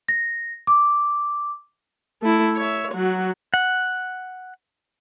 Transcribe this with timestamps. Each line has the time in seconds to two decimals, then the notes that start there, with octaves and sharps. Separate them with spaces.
0.08 A#6
0.67 D6
2.22 A3 E4
2.56 C#5 E5
2.92 F#3 F#4
3.54 F#5